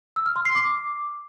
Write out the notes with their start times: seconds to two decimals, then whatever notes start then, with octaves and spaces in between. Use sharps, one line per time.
0.16 E6
0.26 F6
0.36 C6
0.45 C7
0.55 D6